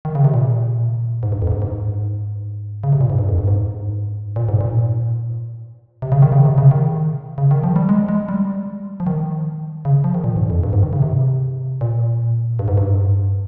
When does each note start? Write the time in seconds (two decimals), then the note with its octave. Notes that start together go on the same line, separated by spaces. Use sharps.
0.05 D#3
0.15 C#3
0.25 C3
0.34 A#2
1.23 G#2
1.32 G2
1.42 F2
1.47 G#2
1.52 G2
1.62 G#2
2.84 C#3
2.93 C3
3.01 A#2
3.10 G#2
3.19 G2
3.29 F2
3.38 G2
3.48 G#2
4.36 A#2
4.49 G#2
4.61 A#2
6.02 C3
6.12 C#3
6.22 D#3
6.32 C#3
6.45 C3
6.58 C#3
6.71 D#3
7.38 C#3
7.51 D#3
7.63 F3
7.76 G3
7.89 G#3
8.09 G#3
8.29 G3
9.00 F3
9.07 D#3
9.85 C#3
10.04 F3
10.15 D#3
10.24 A#2
10.36 G#2
10.50 F2
10.63 G2
10.73 G#2
10.83 D#3
10.93 C#3
11.02 C3
11.81 A#2
12.59 G2
12.68 G#2
12.78 G2